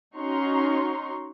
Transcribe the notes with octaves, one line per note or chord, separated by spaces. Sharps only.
C#4 D#4 F#4 A#5 C6 C#6